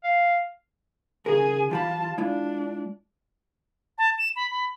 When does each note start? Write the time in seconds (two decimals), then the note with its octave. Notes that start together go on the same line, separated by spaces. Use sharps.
0.04 F5
1.26 C#3 G#4 A#4 G#5
1.71 E3 F4 G4 A5 B5
2.18 G#3 D4 E4 F4
3.98 A5
4.18 E7
4.36 B5
4.50 B5